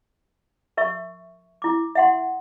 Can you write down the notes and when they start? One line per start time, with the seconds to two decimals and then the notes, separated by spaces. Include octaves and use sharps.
0.77 A#4 E5 C#6
1.62 E4 D6
1.95 E5 F#5 C6